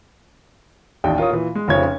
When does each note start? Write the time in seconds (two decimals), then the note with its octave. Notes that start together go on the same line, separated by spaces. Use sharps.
1.04 A1 D#2 D4 G5
1.18 F4 A#4 C#5 D#6
1.31 A#2 E3
1.55 G#3
1.68 F1 C#3 F3 C#5 G#6
1.83 C#4